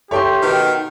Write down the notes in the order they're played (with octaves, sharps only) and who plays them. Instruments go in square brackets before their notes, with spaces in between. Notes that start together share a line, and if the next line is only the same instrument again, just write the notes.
[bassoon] A3 [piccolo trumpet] G4 [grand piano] C#5 G5 C6
[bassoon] B2 [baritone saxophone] D#3